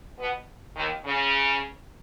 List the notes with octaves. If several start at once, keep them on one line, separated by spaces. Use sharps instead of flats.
B2 B3
D#2 D#3
C#3